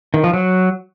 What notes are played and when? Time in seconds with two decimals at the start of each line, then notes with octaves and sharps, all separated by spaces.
0.14 D#3
0.24 F3
0.34 F#3